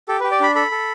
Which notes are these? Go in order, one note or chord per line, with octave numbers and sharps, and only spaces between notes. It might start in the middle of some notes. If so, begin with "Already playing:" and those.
G4 A4
G4 B4
D5
D4 B5
A4 B5
A4